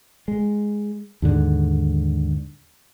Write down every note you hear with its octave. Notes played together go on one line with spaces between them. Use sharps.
G#3
D#2 G#2 D3